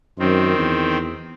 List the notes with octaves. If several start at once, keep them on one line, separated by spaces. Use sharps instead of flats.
F#2 D#3 C4
E2